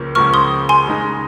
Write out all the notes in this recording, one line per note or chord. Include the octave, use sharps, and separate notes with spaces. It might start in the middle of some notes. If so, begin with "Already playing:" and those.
Already playing: C#2 C#3 F3 A#3
C#2 C#3 F3 A#3 C#6 F6
C6 D#6
G#5 C6
C#3 G#3 D#4